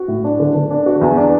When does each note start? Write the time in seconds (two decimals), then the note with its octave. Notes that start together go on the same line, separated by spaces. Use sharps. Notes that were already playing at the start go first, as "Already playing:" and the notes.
Already playing: F#4
0.08 A2
0.24 D4
0.40 D3
0.55 D3
0.70 D4
0.86 F#4
1.01 E2
1.17 D4